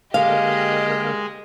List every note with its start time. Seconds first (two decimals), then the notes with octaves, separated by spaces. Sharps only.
0.14 D3 G#3 A#3 G4 G#4 A#4 D#5 F5